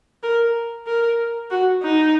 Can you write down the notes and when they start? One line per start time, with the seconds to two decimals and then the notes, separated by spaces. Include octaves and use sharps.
0.23 A#4
0.87 A#4
1.51 F#4
1.83 D#4